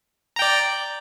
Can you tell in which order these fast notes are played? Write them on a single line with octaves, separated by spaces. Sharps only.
A#5 G5 D5